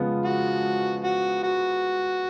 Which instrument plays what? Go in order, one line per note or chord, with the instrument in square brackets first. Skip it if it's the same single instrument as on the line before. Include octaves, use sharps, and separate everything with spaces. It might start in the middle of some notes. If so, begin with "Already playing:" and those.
Already playing: [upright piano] C#3 F3 G#3 B3 F4
[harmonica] F#4
F#4
F#4